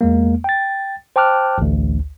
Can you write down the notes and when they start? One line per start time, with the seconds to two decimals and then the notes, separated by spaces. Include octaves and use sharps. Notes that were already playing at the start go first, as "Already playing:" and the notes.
0.01 E2 G#3 A#3
0.44 G5 A6
1.16 C5 G5 A5 D6 F6 F#6
1.58 A1 D2